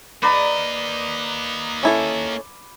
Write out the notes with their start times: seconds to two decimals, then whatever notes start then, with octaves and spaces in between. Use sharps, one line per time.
0.23 A#3 B4 D5 D#5 A#5
1.83 C#4 E4 A4